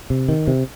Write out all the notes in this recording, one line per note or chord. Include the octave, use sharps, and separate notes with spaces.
C3
D#3
C3